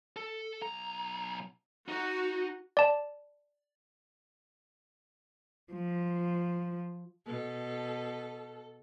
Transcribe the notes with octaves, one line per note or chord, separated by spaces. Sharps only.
A4
B1 A#5
D#4 F#4
D5 A5
F3
B2 A4